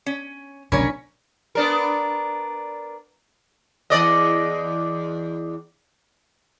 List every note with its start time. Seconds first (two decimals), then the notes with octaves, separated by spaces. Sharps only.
0.06 C#4
0.72 F1 B1 D3 C#4 D4 A#4 C#5 B5
1.55 B3 D4 A#4
3.90 E2 D5 D#5